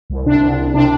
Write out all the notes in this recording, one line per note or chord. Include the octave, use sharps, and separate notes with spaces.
C2
C3 D4
C2
C2
C3 D4